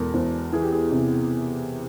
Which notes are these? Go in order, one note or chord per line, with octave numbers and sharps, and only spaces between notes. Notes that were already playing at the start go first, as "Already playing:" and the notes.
Already playing: E2 B2 G#3 A4 A#4
E2 C5
E3 G#4
G4
G#4
C3